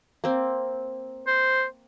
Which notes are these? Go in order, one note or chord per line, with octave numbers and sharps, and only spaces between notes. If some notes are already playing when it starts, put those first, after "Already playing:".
A#3 C4
C5